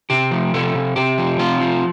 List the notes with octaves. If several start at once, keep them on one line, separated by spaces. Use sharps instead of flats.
C3 G4
F3
C3 A4
C3
C3 G4
F3
C3 F4
F3